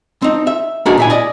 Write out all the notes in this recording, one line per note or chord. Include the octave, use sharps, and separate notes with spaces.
C4 D#4
E5
A#3 B3 D4 D#4 F#4 G#4
A#2 E4 G#5
D5 D#5